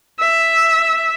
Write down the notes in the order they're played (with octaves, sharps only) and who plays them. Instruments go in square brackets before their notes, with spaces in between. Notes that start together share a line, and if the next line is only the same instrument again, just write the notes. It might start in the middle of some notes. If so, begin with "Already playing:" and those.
[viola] E5